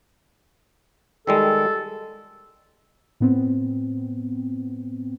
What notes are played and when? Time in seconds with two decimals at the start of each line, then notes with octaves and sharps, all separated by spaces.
1.27 D#3 G3 G#3 A4
3.20 A2 B3 C4